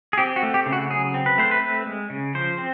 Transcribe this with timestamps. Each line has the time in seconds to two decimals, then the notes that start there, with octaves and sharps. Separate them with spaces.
0.13 G#4
0.18 C4 G4
0.36 F#4
0.43 A3
0.54 G4
0.66 C#3
0.73 F#4
0.90 F#3 G#4
1.14 C4
1.26 B4
1.38 A3 C5
1.51 B4
1.62 C4
1.86 G#3
2.10 C#3
2.35 F3 C5
2.58 C4